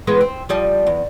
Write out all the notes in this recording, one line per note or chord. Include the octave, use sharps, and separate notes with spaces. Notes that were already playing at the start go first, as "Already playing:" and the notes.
E3 G#3 B3
C4
F3 G3 D#5
E2